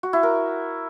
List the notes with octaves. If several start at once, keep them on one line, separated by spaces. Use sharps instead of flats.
F#4
E4
A#4